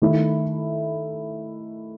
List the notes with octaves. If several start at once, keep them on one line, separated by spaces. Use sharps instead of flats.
D#3 A3 E4